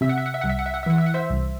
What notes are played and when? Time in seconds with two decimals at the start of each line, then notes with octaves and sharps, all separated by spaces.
0.01 C3 E5
0.09 F#5
0.18 E5
0.26 F#5
0.34 E5
0.41 C2 F#5
0.49 E5
0.59 F#5
0.66 E5
0.74 F#5
0.83 E5
0.86 E3 F#5
0.98 E5
1.06 F#5
1.14 C5 E5
1.30 C2